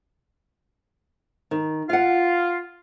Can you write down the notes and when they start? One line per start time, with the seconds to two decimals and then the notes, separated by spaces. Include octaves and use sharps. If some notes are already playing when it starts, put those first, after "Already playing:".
1.51 D#3
1.89 F4 F5 F#5